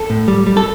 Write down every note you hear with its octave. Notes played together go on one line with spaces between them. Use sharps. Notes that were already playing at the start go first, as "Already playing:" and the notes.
Already playing: A4
A2
G3
G3
A4